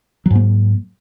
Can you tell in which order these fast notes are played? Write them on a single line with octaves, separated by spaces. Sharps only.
F#3 G#2 A#3